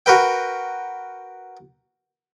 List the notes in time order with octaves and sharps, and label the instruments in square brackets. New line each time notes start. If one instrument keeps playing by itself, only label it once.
[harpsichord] F#4 A#4 B4 G5